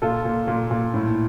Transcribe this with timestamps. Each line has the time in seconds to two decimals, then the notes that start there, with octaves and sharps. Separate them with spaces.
0.02 A#2 F4 A4
0.25 A#2
0.48 A#2
0.71 A#2
0.94 A2